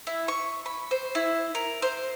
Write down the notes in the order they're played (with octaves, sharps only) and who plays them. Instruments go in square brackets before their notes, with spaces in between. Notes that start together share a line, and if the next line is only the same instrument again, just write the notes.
[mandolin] E4
C#6
B5
C5
E4
A#4
C5